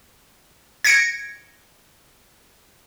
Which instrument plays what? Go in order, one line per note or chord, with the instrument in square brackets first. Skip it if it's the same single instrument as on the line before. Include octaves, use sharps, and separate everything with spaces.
[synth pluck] G#6 A#6 C#7 D7